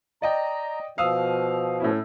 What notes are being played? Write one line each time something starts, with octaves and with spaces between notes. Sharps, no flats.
D5 D#5 G5 A#5
B2 F3 F5 D#6 E6
A2 C#4 E4